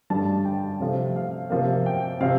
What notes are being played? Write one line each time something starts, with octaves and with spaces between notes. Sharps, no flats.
G2 D3 G3 A5
G5
C3 F3 A3
F5
C3 F3 A#3
G5
C3 F3 F5